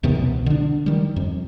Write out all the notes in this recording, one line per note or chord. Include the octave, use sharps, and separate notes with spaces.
D#2 C3 D#3 B3
C2 B2
D3 D4
D#3 G3
F2